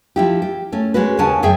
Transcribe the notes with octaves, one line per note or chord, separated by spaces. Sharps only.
F3 E4 G4
G4
A3 C#4
G#3 C#4 F#4 B4
D#2 C#3 C#4 F#5 G#5 A5
F#2 G#4 E5 G5